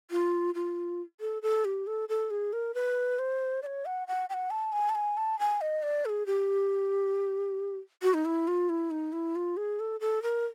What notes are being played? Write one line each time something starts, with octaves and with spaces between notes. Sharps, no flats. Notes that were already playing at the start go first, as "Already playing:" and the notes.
F4
F4
A4
A4
G4
A4
A4
G#4
A#4
B4
C5
D5
C#5
F#5
F#5
G5
F#5
A5
G#5
A5
G#5
A5
G#5
D#5
D5
A4
G#4
G4
F#4
D#4
E4
F4
E4
D#4
E4
F4
G#4
A4
A4
A#4